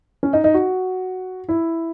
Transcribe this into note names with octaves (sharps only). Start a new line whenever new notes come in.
C#4
D#4
D#4
F#4
E4